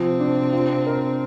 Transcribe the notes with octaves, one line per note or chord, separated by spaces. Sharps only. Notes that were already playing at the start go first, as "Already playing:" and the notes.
Already playing: C3 F3 C4
D4
F4
A#4